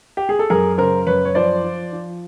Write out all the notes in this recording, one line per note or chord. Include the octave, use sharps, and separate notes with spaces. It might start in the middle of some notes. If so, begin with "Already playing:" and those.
G4
G#4
A4
F#2 G#4 A#4
C#3 A#4 C5
F#2 B4 C#5
C#5
F3 C5 D5
F3
F3